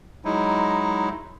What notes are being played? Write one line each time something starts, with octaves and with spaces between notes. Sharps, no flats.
F#3 G#3 D#4 E4